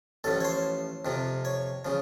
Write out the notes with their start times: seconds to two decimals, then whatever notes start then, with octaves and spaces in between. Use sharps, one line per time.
0.24 A1 A2 F3 A4
0.41 C#5
0.45 C5
1.05 F2 C3 F3
1.45 C#5
1.85 C#3 F3